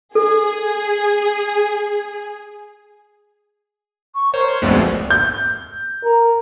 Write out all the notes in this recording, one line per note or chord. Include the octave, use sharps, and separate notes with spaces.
G#4 A4
C#6
A#4 C5 C#5
D1 A#1 F2 G#3 A3 B3 C5
G6
A#4